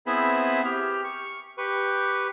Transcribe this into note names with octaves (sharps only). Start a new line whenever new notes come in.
B3 C4 E4 G#4 E5 B5
G4 F6
C#6
G4 B4 C#6